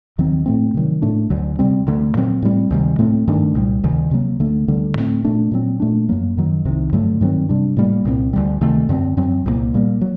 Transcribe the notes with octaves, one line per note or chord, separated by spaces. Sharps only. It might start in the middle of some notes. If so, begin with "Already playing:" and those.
D#2 D#3 F#3 C4
A2 A3 C4
C3 D#3 F#3
A2 A3 D4
D2 D3 F#3
C3 G3 C4
D2 D3 A3
A#2 F#3 C4
A2 G3 C4
D2 C3 D#3 G3
A2 A3 C4
G2 D#3 A3 D4
C2 A#2 G3
D2 C3 D#3
C3 F#3 A#3
D2 D3 A3
D2 D3 G3
A2 A3 C4
A#2 A3 D4
A#2 F#3 C4
A#2 A3 D4
F#2 F#3 A#3
F#2 D#3 F#3
C2 C3 D#3
G2 D3 F#3 A3
G2 D#3 F#3 C4
C3 G3 D4
A2 G3 A#3
C2 A#2 F#3 C4
D2 D3 G3
D2 C3 D#3 A3
F#2 D3 A3 C4
F#2 F#3 C4
C2 A#2 G3 A#3
A#2 G3 A#3
F#3